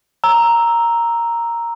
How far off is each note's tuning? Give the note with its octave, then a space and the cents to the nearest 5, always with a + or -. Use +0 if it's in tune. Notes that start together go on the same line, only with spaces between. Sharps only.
A#5 +0 E6 +0